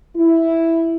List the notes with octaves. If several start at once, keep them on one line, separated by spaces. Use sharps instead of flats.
E4